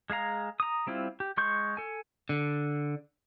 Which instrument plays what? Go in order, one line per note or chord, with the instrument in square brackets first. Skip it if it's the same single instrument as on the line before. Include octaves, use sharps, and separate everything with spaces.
[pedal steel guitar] G#3 G#4 F5 A#5
A#5 D#6
G3 C4 E4 F4
G4
G#3 C6 C#6 G6
A4 G#5
[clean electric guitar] D3